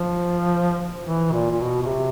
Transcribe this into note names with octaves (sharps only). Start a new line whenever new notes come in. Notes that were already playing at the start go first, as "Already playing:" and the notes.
Already playing: F3
E3
A#2
A#2
B2
B2
C3